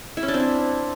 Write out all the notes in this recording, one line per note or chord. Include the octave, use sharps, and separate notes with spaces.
E4
C#4
D4
C4
E4